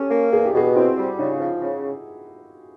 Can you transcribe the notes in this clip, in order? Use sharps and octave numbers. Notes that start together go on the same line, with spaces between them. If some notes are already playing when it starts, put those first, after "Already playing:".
Already playing: C#4 G4 A4
A#3
E2 G#4
G4
B2 F#4 G#4
C4 E4 F#4
G3
C#3 D#4 F4
F3
C#3